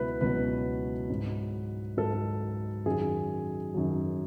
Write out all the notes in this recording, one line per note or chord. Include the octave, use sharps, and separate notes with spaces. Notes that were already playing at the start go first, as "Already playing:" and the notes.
Already playing: C#2 B2 F#3 E4 B4
C#2 B2 F#3 B4
G#2 F#3
G#2 F#3 A4
F#2 D#3 F#3 G#4
F#2 D#3 F#3